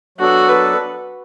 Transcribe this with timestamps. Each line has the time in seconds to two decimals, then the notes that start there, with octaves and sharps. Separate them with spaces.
0.18 F#3 B3 D4 F#4 A4
0.48 B4